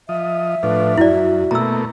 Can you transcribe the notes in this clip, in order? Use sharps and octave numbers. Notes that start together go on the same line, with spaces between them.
F3 D#5 E5
A2 F3 D4 B4
F#2 E4 F#4 D5
B2 A3 A#3 A#5 E6